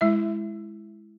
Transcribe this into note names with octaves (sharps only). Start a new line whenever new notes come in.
G#3 E4 E5